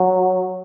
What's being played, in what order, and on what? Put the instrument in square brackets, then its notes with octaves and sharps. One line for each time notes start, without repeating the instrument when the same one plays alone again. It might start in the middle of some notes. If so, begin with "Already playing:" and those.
Already playing: [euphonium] F#3